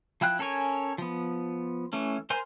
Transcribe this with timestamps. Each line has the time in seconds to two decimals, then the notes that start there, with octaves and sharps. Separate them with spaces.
0.21 F3 E4 G5 F#6
0.39 C#4 A4 A#4 C#5 G#5
0.98 F3 B3
1.93 E3 A3 C#4
2.30 A#4 C5 G#5 C6